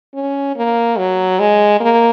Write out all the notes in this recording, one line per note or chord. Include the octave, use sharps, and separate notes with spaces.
C#4
A#3
F#3
G#3
A#3